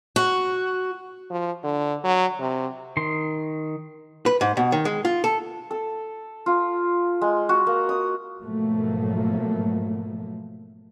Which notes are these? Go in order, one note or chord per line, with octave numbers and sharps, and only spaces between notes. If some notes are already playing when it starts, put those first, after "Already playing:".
F#4
F3
D3
F#3
C3
D#3 C6
B4
G#2
B2
D#3
G#3
F4
A4
A4
F4
G#3
F#4
A#3
D#6
G#2 B2 F3 F#3 A3 A#3